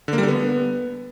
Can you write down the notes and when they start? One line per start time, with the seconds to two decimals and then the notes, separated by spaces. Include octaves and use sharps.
0.08 D3
0.13 A#3
0.18 G3
0.23 D3
0.28 B3